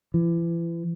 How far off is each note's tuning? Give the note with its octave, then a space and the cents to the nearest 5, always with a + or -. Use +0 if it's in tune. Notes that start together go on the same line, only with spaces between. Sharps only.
E3 +35